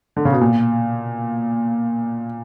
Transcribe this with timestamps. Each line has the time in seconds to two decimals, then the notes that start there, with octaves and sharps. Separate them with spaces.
0.16 D3
0.25 C#3
0.32 B2
0.41 A#2